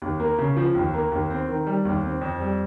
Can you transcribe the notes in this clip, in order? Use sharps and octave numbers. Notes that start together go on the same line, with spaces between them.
D#2
A#3
C#3
F3
D#2
A#3
D#2
C4
D#3
G3
D#2
C4
F2
G3